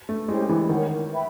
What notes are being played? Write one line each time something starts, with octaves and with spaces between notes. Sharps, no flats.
A3
G#3 C#4 E4 G4 C5
E3
D#3 A#4 C#5 F#5
B4 E5 G5 B5